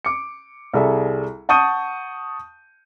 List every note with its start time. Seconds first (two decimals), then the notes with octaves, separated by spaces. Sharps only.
0.05 D6 C#7
0.74 C2 G3 G#4 A4 E5
1.49 F#5 A5 C#6 D#6 G6 D#7